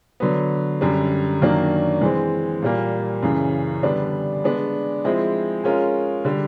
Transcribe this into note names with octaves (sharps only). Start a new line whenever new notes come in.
D3 F#3 B3
F#2 D3 G3
F#2 D#3 F#3 A#3 D4
E3 G#3 C4
A#2 G3 A#3
F#2 C#3 E3
D3 G3 B3 D4
G#3 B3 D4
F3 G#3 C4 E4
G#3 C#4 F4 A#4
D3 G3